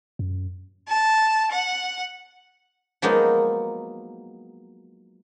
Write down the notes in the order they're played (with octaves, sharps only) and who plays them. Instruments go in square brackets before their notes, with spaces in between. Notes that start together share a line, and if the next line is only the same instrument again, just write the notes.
[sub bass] F#2
[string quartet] A5
F#5
[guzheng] F3 F#3 G#3 A#3 B3 D#4